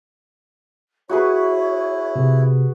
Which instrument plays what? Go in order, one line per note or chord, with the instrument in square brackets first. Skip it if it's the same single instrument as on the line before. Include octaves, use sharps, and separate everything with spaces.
[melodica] E4 [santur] F#4 G#4 B4 [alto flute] C#5
[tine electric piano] C3